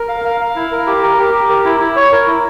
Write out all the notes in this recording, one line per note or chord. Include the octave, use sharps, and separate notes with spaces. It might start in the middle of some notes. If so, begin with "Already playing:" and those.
Already playing: A#4
F5
F5
F5
E4
A#4
G4
A#4
G4
G4
A#4
E4
E4
C#5
A#4
E4